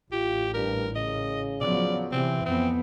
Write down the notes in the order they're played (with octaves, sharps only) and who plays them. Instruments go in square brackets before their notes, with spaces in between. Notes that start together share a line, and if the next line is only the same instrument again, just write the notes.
[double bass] A1 [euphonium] F4 [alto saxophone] G4
[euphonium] G2 [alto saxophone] A#4
[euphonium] C#3 [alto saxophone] D#5
[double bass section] F3 F#3 [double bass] B3 [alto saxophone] D5
[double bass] C3 [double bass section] E3 [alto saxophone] C4
[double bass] F2 B3 [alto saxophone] C4